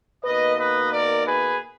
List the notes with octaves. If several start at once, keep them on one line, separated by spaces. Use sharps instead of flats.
B2 A#3 D#4 B4 D#5
B4 D#5
A#4 D5
G#4 B4